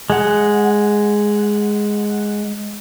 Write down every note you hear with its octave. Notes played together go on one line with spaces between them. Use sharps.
G#3 F#5